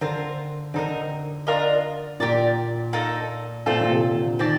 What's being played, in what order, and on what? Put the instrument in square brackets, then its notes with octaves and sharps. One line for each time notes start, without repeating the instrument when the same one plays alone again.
[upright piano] D3 [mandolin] C4 F4 A#4
[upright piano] D3 [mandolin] C4 D#4 A#4
[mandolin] D4 F4 A#4 D#5
[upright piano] A#2 [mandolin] G4 A#4 D5
[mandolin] A#3 D#4 A4
[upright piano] A#2 [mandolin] A3 C4 F4 A4
[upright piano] A#2
C3
D3
[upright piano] D#3 [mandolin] C4 G4 D5 A5